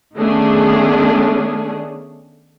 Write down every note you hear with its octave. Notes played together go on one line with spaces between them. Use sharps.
D#3 A3 B3 C#4 D4 G#4